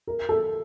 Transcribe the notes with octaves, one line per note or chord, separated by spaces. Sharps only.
A#4
A4